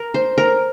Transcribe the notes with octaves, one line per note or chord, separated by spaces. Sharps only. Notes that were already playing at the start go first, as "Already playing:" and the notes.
Already playing: A#4
C5
A#4